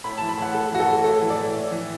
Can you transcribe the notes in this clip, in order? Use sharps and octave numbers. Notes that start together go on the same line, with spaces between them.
A2 B5
E3 A5
B5
A2 F#5
A2 A4
E3 F#4
A4
A2
A2 A4
E3
D5
A2
A2
E3